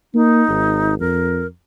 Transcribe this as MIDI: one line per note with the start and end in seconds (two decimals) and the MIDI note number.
0.14 0.43 58
0.14 0.95 63
0.49 0.95 32
1.00 1.44 41
1.00 1.46 70